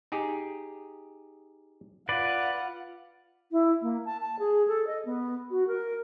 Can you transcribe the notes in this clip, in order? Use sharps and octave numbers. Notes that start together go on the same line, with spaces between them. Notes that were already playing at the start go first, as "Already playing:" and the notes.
D#4 G4 G#4
F4 B4 D5 F#5
E4
A#3
A5
A5
G#4
A4
D#5
B3
F#4
A#4